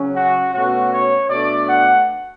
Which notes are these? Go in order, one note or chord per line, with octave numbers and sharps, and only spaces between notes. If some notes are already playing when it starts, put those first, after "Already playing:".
Already playing: C#3 F#3 C#4
F#4
B2 A3 C#4 F#4
C#5
B2 A3 D4 D5
F#5